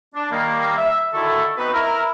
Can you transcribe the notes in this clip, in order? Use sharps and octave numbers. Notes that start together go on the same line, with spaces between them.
D4
D#3 G3 A#3
E5
D3 D#3 E4 F#4 A4
B3 C4 D#4 F#4 B4
E4 A#4